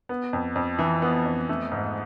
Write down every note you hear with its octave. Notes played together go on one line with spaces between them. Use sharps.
B3
F2
F2
E3
B3
F2
A3
G#2